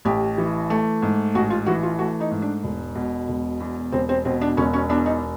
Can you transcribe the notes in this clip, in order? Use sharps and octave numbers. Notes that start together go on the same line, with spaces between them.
A1 G4
E3
A3
G#2
A1 F#4
F4
E3 F#4
F4
A3 F#4
D#4
G#2
D4
E1
B2
E1
E2
E1 C4
C4
B2 C4
D4
E1 C#4
C#4
E2 D4
D#4